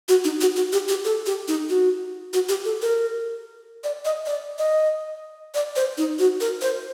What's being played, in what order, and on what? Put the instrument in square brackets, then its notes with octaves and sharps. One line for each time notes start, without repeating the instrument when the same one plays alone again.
[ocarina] F#4
D#4
F#4
F#4
G4
G4
A4
G4
D#4
F#4
F#4
G4
A4
A#4
D5
D#5
D5
D#5
D5
C5
D#4
F#4
A#4
C5